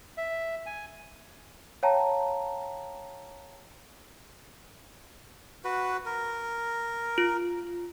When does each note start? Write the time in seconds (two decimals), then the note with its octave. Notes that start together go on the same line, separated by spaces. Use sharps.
0.18 E5
0.66 G#5
1.83 C#5 F5 G5 A5 A#5
5.64 F#4 B4
6.06 A#4
7.18 F4